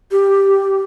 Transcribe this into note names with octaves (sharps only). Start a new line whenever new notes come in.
G4